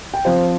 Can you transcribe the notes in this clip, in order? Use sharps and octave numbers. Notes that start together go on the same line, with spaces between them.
G5
F3 C4 C5 F5